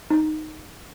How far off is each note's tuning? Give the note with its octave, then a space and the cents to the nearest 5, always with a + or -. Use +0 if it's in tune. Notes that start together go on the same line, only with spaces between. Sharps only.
D#4 -5